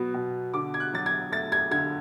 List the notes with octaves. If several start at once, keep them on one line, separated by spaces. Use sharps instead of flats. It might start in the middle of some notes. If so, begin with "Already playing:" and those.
Already playing: B2 F#3 B3
B2
D3 D6
G#6
F#6
F#3 A6
G#6
A3 A6
G#6
D3 G#6